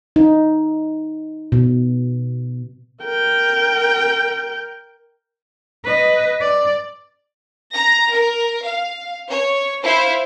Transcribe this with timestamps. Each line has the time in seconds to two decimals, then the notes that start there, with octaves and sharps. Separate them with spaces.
0.16 D#4
1.52 B2
3.04 A#4 G5
5.84 B4 D#5
6.41 D5
7.74 A#5 A#6
8.13 A#4
8.66 F5
9.31 C#5
9.83 E4 C5 F5